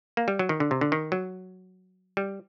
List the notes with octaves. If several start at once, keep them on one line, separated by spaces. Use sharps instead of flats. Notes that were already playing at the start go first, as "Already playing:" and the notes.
A#3
G3
F#3
D#3
D3
C3
D3
D#3
F#3
G3